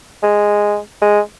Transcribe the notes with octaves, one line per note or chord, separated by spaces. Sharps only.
G#3
G#3